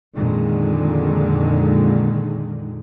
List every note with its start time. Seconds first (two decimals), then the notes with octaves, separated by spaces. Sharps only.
0.16 F2 A#2 D3 D#3 G#3